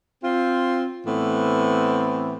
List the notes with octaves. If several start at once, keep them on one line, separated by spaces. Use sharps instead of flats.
C4 F4
A2 E3 B3 C4